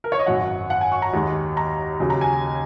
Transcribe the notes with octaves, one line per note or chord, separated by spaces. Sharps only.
A#4
C#5
D#5
G#1 F#2 F#3 F#5
F#5
G#5
C#6
A#5
D#2 D#3 G#3
A#5
D#2 C#3 F#3
A#5
G#5